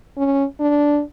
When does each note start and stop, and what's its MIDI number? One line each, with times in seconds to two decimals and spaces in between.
0.17 0.44 61
0.60 1.01 62